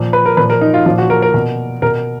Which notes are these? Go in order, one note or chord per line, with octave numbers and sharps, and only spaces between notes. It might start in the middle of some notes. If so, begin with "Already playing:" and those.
Already playing: A#2 F3
B4
A#4
A#2 F3 B4
A#4
D#4
F4
A#2 F3 F4
F#4
A#4
A#4
B2
B2 A#4